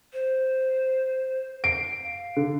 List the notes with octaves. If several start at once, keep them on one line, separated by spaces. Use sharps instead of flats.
C5
C7 D7
F5
D3